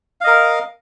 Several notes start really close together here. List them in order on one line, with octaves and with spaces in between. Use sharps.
F5 D#5 A#4